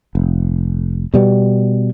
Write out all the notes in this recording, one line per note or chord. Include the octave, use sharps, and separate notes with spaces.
F1
B2 G3 B3